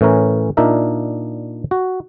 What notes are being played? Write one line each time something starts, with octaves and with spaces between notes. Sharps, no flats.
A2 E3 C#4 A#4
A#2 D4 D#4 A#4 E5
F#4